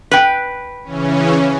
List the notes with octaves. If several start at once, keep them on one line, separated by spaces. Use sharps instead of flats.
B4 G5
C#3 E3 C#4